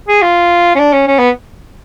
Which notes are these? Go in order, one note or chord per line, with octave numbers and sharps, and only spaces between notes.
G#4
F4
C#4
D4
C#4
C#4
B3